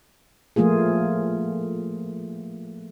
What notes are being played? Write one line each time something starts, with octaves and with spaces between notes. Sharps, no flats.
F3 A3 A#3 F4 G#4